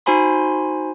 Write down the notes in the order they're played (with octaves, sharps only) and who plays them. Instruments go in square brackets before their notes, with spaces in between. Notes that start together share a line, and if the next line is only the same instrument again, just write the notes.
[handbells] D#4 F#4 C5 G#5 B5 C6